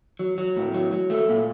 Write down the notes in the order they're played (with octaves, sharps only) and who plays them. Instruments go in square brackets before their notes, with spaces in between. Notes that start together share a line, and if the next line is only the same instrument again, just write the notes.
[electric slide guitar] F#3
F#3
A2
F#3
F#3
A3
A#2